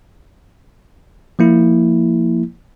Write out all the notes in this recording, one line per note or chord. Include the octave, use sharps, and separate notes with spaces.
F3 A#3 E4